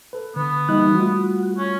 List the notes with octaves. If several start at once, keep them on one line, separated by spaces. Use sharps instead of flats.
A4 B4
D3 B3
E3 G3 A#3 D#4 D#5 F#6
G3 A3 F4 F#4
C#4